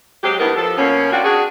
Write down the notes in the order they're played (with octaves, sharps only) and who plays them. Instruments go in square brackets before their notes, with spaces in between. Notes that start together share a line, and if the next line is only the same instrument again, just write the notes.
[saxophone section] F#3 G#3 C4 G4
G2 B3 D#4 E4 A#4
F3 A4
B2 A#3 C#4
C4 D4 F4 F#4
D4 F#4 G#4